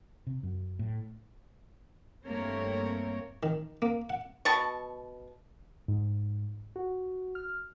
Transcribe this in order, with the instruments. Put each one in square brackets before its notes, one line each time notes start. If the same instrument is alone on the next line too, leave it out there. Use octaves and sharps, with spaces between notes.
[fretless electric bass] C3
F#2
A2
[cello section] G2 A3 A#3 C4 A#4 C#5
[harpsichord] D#3
A#3
F#5
[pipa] B2 A5 C#6
[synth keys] G#2
F#4
F6